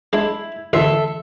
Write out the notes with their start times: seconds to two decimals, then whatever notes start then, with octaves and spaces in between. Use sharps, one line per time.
0.13 G#3 D4 E4
0.73 A1 D2 A4 E5 C6